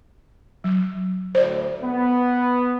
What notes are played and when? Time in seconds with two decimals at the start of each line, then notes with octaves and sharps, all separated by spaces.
0.64 F#3
1.35 D2 A2 C5 D5
1.82 B3